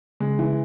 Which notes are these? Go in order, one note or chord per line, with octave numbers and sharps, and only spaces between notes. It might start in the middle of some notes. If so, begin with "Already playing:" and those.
C#3 G#3
E3